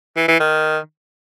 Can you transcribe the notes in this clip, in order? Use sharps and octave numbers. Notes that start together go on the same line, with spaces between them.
E3
E3
D#3